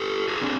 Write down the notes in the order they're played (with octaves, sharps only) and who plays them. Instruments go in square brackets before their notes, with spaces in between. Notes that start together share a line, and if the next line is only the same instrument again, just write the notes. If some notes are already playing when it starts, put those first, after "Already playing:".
Already playing: [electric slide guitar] G4 A4
F#4 G#4
C4 D4